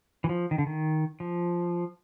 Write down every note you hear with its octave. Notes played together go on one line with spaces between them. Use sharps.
E3
F3
D#3
D3
D#3
F3